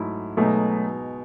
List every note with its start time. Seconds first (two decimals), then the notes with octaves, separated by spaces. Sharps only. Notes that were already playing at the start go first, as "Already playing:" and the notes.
Already playing: G#2 F#3 A3 E4
0.37 B2 F#3 G#3 A3 D#4